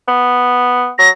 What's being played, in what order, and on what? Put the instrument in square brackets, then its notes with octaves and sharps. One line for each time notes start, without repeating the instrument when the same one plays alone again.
[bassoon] B3
[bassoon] F#3 [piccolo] A#6